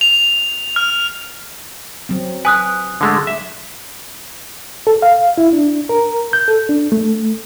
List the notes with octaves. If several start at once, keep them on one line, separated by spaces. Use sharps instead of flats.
F7
F6
F#3 C4
B4 G#5 D#6 F#6
D3 G#3 A3
E5
A4
F5
E4
D4
A#4
G6
A4
D4
A3